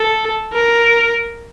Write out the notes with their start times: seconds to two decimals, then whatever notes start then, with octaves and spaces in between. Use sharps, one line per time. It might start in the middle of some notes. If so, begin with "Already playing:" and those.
Already playing: A4
0.52 A#4